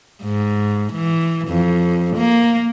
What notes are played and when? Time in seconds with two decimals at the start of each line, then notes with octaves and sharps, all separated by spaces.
0.23 G#2
0.93 E3
1.48 F2
2.17 A#3